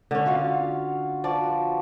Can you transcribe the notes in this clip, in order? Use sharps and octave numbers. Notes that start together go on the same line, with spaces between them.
D3 C#4
F4 F#4 F5
F3 F#4 B4 D5